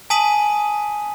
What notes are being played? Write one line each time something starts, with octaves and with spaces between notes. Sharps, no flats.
G#5 A5 D#6 B6 D#7 F#7